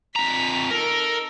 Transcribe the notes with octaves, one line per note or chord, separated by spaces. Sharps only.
F2 A#5 B6
D#4 A4 A#4